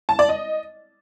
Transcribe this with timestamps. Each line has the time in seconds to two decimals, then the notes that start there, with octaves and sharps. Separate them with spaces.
0.09 A5
0.19 D5
0.29 D#5